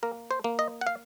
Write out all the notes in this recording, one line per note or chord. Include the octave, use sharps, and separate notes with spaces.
A#3 A#4
C5
A#3
D#5
F#5
F5